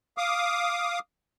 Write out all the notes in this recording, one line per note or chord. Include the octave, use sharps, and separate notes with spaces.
F5 D6 D#6